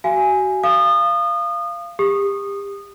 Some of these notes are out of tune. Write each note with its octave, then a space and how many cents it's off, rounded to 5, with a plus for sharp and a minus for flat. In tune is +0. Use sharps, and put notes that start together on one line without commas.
F#4 +30 F5 -35 G#5 +0
F5 -20 D#6 -30
G4 +30 D#6 -20